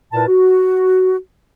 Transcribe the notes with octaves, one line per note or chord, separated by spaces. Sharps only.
A#2 E4 A#4 B4 A5
F#4